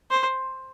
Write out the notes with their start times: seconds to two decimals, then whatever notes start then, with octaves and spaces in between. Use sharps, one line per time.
0.11 C5